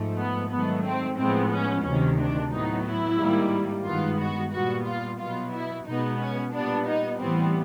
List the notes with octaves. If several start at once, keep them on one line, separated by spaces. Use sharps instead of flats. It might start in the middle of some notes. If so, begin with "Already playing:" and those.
Already playing: G#2 F3 A3
B3
G#2 D#3 F#3 A3 B3
C4
A2 F3 G#3 B3 C4
C#4
D2 C3 D#3 C#4
D4
A2 F#3 B3 D#4
E4
G#2 D#3 G3 A#3
G2 D#3 G#3 B3 F4
F#4
A#2 G3 B3 F#4
F4
B2 F#3 B3 F4
E4
B2 G#3 B3 D#4
C#4
A#2 G3 B3 D4
D#4
A2 E3 G3 B3 C4